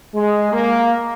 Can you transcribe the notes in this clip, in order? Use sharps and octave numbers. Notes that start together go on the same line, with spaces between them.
G#3
A#3